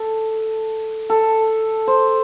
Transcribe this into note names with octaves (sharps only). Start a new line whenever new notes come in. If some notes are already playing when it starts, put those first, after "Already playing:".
Already playing: A4
A4
C5